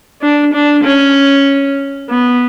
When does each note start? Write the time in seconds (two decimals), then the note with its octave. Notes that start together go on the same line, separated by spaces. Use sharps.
0.21 D4
0.54 D4
0.84 C#4
2.10 B3